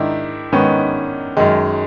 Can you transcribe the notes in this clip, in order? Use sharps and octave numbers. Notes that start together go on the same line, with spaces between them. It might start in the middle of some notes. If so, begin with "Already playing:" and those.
Already playing: G#2 D#3 D4 E4
G#2 D#3 B3 C#4
F#2 D#3 G#3